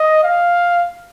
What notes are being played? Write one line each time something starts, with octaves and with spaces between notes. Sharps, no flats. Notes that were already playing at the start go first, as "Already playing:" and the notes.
Already playing: D#5
F5